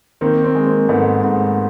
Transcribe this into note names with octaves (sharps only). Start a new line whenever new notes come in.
D#3 A#3 C4
A#3 C4
G#3
A#3 C4
G#2 A3 B3
G#2